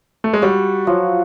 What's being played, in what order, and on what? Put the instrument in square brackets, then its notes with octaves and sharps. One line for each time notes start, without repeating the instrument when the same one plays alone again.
[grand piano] A3
G#3
[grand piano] G3 [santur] F#4
[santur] F3 [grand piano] F#3